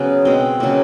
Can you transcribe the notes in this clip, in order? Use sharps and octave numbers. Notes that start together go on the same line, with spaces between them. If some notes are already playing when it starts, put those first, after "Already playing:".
Already playing: C#3 F#3 B3 C#4
B2 G#3 C4
C#3 F#3 A#3